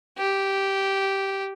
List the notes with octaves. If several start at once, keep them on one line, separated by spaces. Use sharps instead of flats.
G4